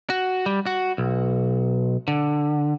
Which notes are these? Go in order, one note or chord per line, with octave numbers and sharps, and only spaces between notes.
F#4
G3
F#4
B1
D3